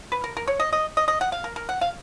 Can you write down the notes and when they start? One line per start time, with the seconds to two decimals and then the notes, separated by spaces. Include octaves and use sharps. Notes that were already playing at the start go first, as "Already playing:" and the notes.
0.12 B4
0.24 A#4
0.37 A#4
0.47 C#5
0.60 D#5
0.73 D#5
0.97 D#5
1.08 D#5
1.21 F#5
1.32 F5
1.44 A#4
1.56 A#4
1.69 F#5
1.81 F5